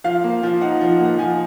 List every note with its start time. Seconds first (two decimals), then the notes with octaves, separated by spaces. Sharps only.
0.04 F3 F5
0.24 A#3
0.43 F3
0.61 D#4 F#5
0.81 F3
0.90 F#5
1.00 A#3
1.05 F#5
1.18 F3 G#5